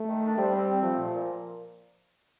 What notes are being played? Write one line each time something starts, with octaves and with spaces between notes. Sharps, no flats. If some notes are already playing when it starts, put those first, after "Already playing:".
Already playing: A3
D#3
D4
G3 C4
C4
C4
F3 A3
A#2
A#2